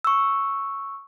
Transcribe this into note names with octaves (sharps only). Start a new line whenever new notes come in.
C#6 E6